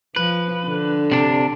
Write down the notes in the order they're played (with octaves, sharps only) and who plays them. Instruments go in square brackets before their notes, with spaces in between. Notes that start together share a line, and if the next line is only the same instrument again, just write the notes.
[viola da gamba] F3 [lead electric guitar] B4
[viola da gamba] D3
[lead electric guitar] C3 D4